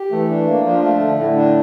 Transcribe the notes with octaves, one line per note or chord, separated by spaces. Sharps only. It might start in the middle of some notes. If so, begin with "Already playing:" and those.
Already playing: G4
E3 A3
D4
A#3
F3 D4
A3
D3
A2 D3
D4